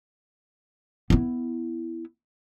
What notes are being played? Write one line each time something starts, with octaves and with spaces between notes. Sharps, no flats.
B3 E4